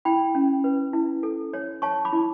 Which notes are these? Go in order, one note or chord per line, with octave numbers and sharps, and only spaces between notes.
E4 G5 B5
C#4
B4
E4
A4
C#5
C#5 A5 C#6
B5 D6
E4